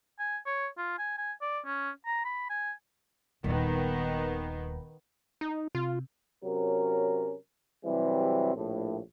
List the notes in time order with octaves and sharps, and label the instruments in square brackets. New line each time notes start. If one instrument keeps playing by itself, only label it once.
[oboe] G#5
C#5
F4
G#5
G#5
D5
C#4
A#5
B5
G#5
[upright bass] D#1 [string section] D#3 B3
[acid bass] D#4
[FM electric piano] C3 [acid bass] F4
[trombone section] C3 F#3 C#4 A#4
C3 E3 F#3 G3 C4
A#1 A2